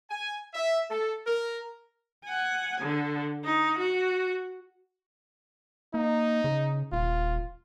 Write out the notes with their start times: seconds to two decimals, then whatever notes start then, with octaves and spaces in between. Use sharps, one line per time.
0.10 G#5
0.54 E5
0.90 A4
1.27 A#4
2.25 F#5 G#5
2.80 D3
3.44 D#4
3.78 F#4
5.94 A#3 D#4
6.44 C#3
6.92 D#1 F4